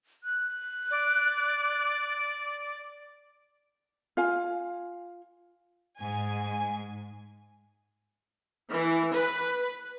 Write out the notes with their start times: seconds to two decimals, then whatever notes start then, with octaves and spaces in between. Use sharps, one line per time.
0.24 F#6
0.91 D5
4.17 F4 F5 G#5
5.98 G#2 G#5
8.71 E3
9.13 B4